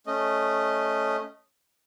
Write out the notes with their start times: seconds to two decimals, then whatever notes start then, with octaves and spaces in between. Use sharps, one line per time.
0.07 A3 C#4 D#5